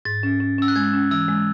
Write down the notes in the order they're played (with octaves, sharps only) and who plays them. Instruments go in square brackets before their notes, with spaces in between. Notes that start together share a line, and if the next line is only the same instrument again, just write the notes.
[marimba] G#2 [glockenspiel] A6
[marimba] C#4
C#4
[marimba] C#4 [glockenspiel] E6
[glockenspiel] F#6
[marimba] G#3 [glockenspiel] G#6
[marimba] C#4
[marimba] E3 [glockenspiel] E6
[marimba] G#3